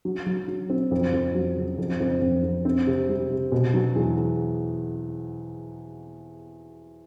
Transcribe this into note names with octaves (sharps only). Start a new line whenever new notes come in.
F#3
F#3
F#3
C4
F2
F2
F#3
C#3
F2
F2
F2
F2
C4
C3
G3
C3
B2
F#3
E2